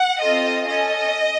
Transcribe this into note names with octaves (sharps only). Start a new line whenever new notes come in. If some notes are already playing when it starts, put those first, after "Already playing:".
Already playing: F#5
C4 F4 A4 D#5
C#4 A4 D#5